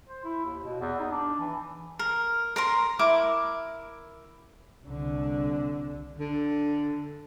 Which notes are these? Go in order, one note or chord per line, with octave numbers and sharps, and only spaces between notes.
C5
E4
D#2
B2
E2
D#4
D4
E3
A#4
A#4 A#5 C6
E4 A#4 D6
C2 D3
D3